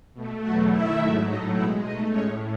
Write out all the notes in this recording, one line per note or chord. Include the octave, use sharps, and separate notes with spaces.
B2 A3
E2 B2 F#3 A3 F#4 F#5
F#2 D#3 A3 E4 E5
G#2 F#3 A3
A2 F#3 A3 D#4 D#5
B2 G#3 E4 E5
B2 D#4 D#5
A3
A2 G#3 C#4 C#5